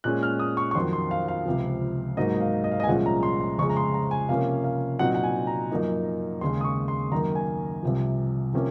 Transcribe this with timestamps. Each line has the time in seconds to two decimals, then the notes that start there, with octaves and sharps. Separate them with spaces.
0.04 A#2 G#3 C#4 F#6
0.23 F6
0.39 D#6
0.57 C#6
0.71 C#6
0.75 F2 D#3 F#3 C6
0.93 C6
1.11 F5
1.28 F5
1.46 C#2 C3 F3
2.17 G#2 F#3 A#3 D#4 D#5
2.40 F5
2.64 D#5
2.71 F5
2.80 D#5
2.83 G#5
2.87 C2 A#2 F3 G#3 C#4 F#5
3.06 A#5
3.23 C6
3.40 C6
3.58 F2 C#3 G#3 C#6
3.69 A#5
3.77 C6
3.94 A#5
4.11 G#5
4.29 C3 F3 A#3 C#4 F5
4.64 F5
4.99 A#2 F#3 C4 D#4 F#5
5.15 F#5
5.24 G#5
5.47 A#5
5.71 F#2 F3 A#3 D#4
6.41 D#2 C#3 G#3 C6
6.61 D#6
6.64 C#6
6.88 C6
7.12 F#2 D#3 A#3 A#5
7.35 G#5
7.83 C2 C3 F3
8.53 C3 F3 A#3 C#4